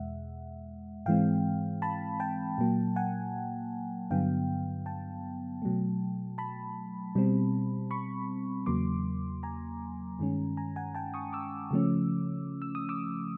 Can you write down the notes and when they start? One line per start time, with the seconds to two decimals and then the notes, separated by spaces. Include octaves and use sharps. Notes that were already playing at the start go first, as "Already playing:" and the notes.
Already playing: E2 B2 G#3 E5 F#5
1.06 G#2 E3 G#3 C4 F5 G5
1.82 A5 B5
2.20 G5 A5
2.58 A#2 F#3 A#3
2.96 F#5 G#5
4.10 G2 D3 F#3 B3 F5 G5
4.86 G5 A5
5.62 B2 F#3 A3
6.38 A5 B5
7.15 B2 G3 C4
7.91 B5 C#6
8.66 E2 C#3 F#3 A#3 C6 D6
9.43 G#5 A#5
10.19 G2 D#3 G#3 C#4
10.57 G#5 A#5
10.76 F#5 G#5
10.95 G5 A5
11.14 C#6 D#6
11.33 D6 E6
11.71 C#3 F3 A3 C#4
12.62 E6
12.75 D#6
12.89 D6 E6